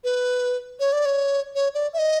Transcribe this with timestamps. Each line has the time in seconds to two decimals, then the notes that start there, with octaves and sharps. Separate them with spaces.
0.04 B4
0.80 C#5
0.93 D5
1.05 C#5
1.55 C#5
1.74 D5
1.94 E5
1.98 D#5